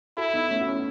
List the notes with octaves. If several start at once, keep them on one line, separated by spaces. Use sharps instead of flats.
E4 F#4 A4
B3 D#4
A3 C#4
F#4
C#4 E4